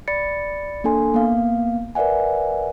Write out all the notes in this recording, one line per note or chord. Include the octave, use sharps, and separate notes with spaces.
D5 B5 A6 C#7
A#3 D4 A4 G#5 C6
A#3 B3 F5
A#4 B4 D5 E5 F#5 G#5